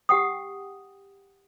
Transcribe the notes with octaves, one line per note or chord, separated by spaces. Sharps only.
G4 F#5 G5 D#6